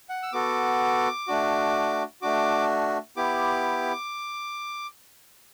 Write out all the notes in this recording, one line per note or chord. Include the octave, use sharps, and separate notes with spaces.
F#5
E6
B3 F#4 A4 D6
A3 D4 F#4
A3 D4 F#4 D6
B3 E4 G4 D6